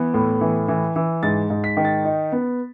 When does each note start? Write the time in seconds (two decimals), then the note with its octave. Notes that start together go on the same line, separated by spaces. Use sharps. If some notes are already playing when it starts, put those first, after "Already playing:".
Already playing: E3 B3
0.14 A2
0.41 E3
0.68 E3
0.96 E3
1.23 G#2 A6
1.50 G#2
1.64 B6
1.77 D#3
1.85 A6
2.05 D#4
2.32 B3